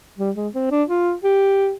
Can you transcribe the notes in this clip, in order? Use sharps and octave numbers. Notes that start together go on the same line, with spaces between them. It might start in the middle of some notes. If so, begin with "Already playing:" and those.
G3
G#3
C4
D4
F4
G4